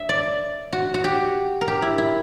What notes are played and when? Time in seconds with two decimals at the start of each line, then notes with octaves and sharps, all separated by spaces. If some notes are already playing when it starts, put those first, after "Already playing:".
Already playing: E5
0.09 D5
0.73 F#4
0.94 F#4
1.04 G4
1.61 A#4
1.68 G4
1.82 E4
1.98 E4